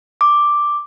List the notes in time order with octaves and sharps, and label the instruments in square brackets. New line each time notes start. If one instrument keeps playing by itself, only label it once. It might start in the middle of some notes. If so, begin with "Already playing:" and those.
[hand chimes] D6